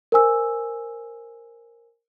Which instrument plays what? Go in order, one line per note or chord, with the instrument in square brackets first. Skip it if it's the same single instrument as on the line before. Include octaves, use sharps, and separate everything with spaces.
[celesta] A#4 C5 G#5 E6